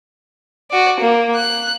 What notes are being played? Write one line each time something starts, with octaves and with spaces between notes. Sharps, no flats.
F#4 D5
A#3
F#6